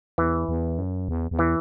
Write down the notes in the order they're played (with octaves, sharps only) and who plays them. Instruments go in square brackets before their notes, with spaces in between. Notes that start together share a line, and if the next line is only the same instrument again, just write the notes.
[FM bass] E2 [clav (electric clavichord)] E3
[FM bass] E2
F#2
E2
E2
[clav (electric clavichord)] E3